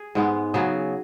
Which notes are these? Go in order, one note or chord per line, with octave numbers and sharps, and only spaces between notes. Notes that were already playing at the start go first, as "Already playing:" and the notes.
Already playing: G#4
G#2 G#3 B3
C#3 F#3 B3 G#4